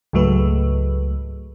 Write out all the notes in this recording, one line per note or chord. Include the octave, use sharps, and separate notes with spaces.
C#2 G#2 F#3 A3 B4